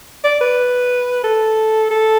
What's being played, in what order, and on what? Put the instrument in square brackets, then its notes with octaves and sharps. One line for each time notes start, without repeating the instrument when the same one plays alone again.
[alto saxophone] D5
B4
A4
A4